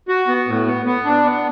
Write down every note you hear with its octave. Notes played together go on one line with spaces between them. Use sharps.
F#4
B3
A2
B3
B3
D4
B3